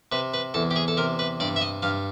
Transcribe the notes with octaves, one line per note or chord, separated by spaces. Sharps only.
C3 B4
B4
E2 A4
G4
G#4
A4
C3 A#4
B4
G2 D5
E5
D#5
G2 F5